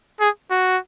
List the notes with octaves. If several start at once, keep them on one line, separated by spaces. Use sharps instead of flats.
G#4
F#4